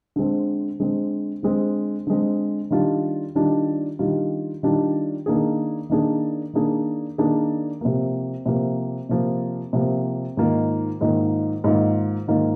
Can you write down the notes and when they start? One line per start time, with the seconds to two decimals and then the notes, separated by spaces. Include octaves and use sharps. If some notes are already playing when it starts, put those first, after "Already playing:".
0.16 D3 G#3 C4
0.80 D3 G#3 C4
1.43 D3 G#3 C4
2.07 D3 G#3 C4
2.70 D#3 G3 D4 F4
3.35 D#3 G3 D4 F4
3.99 D#3 G3 D4 F4
4.63 D#3 G3 D4 F4
5.26 D#3 A#3 D4 G#4
5.90 D#3 A#3 D4 G#4
6.53 D#3 A#3 D4 G#4
7.18 D#3 A#3 D4 G#4
7.81 C3 F3 A#3
8.46 C3 F3 A#3
9.09 C3 F3 A#3
9.73 C3 F3 A#3
10.37 G#2 D#3 A#3 F4
11.01 G#2 D#3 A#3 F4
11.64 G#2 D#3 A#3 F4
12.28 G#2 D#3 A#3 F4